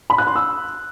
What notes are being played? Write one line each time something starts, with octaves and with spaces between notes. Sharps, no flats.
B5
F#6
C6
E6